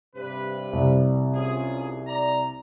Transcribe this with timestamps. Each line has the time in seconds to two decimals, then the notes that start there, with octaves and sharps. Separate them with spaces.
0.16 G2 C3 B4
0.73 C2 G3
1.34 C#4 F4 G#4
2.07 D5 A#5